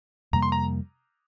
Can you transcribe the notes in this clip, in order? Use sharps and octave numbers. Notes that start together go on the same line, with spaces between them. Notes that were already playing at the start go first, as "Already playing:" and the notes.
F2 C3 G3 A#3 A#5
C6
A#5